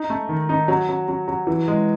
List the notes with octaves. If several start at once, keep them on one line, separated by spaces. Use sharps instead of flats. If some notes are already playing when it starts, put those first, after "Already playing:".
Already playing: D#4
A3
D#3
D#4
F#3
F#3
F#3
F#3
E3
G#3